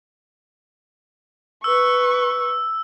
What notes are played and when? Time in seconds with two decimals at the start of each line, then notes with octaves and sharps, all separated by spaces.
1.64 B4 C#6 E6